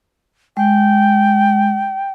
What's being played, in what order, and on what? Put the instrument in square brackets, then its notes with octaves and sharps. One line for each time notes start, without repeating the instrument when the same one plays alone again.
[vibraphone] G#3 [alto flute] G5